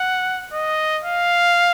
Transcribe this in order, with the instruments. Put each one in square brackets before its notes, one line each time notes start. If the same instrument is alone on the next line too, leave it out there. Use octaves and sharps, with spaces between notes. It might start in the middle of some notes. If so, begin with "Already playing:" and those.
Already playing: [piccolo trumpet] F#5
D#5
F5